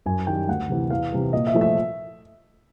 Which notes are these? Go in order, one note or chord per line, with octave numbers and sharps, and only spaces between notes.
F#2 G#5
D#3 G3 G5
D2 F#5
C3 E3
E2 F5
C3 E3
A#2 D#5
E5
F3 A3
E5